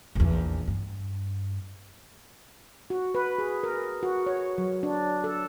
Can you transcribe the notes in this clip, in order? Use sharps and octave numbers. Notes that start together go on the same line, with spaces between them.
A#1 E2
G2
F#4
B4
G#4
A#4
F#4
C#5
F#3
D4
A4